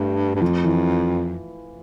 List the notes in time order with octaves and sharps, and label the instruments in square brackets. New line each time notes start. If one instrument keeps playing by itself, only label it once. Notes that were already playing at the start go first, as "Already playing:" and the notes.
Already playing: [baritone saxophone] G2 [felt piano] A3
[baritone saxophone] G2
[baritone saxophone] F2 [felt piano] F3
[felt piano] E3